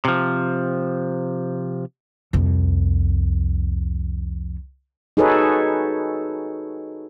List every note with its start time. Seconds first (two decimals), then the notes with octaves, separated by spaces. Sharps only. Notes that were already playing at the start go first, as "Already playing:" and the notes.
0.05 C3 F3
2.33 C2 F2
5.17 D#4 F#4 G#4 A4 B4 C#5